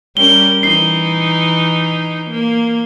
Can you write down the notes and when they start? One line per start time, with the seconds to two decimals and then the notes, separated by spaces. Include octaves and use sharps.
0.17 G3 C#4 A#4 G7
0.63 E3 D#4 C7 G7
2.31 A#3